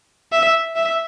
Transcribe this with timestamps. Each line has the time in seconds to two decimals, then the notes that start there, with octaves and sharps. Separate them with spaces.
0.32 E5
0.76 E5